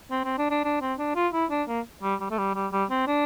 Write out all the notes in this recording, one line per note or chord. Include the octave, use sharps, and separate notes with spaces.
C4
C4
D4
D4
D4
C4
D4
F4
E4
D4
A#3
G3
G3
A3
G3
G3
G3
C4
D4